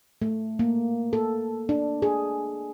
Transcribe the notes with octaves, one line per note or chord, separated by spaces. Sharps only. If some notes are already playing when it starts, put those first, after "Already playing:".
A3
A#3
A4
D4
G#4